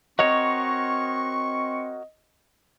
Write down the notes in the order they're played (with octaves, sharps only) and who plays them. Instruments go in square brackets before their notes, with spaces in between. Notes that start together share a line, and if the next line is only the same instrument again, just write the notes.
[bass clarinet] C4 [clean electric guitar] F#4 A#4 C#5 [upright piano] D#5 [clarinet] C#6